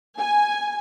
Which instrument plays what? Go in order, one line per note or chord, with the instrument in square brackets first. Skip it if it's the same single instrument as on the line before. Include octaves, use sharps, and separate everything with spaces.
[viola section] G#5